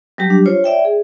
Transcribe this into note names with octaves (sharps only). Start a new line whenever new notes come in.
F#3 G3 G4
D4
F4 C5 C#5
D5 E5 G5
G#4